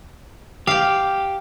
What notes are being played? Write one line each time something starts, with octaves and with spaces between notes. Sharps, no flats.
G4 F5 G5